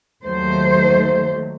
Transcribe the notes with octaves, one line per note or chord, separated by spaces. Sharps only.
D#2 D#3 F#3 A3 C5